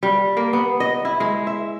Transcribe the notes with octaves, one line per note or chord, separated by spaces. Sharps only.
G3
A#3
B3
D#5
E4
G#3
E5